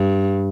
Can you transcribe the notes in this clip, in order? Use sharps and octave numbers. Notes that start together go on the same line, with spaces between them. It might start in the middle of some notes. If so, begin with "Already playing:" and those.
Already playing: G2